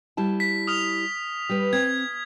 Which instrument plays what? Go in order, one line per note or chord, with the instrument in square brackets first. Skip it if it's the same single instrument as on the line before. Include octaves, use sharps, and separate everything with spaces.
[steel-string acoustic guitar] G3 E4 A5
[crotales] B6
D#6 F6 F7
[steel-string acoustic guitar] G3 B4
[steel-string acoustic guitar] C4 [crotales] G#6